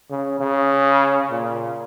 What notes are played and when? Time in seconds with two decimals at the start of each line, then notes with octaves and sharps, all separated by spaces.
0.10 C#3
0.40 C#3
1.30 A#2